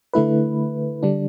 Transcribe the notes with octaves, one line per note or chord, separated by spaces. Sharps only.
D3 A3 E4 B4
D3 G3 D4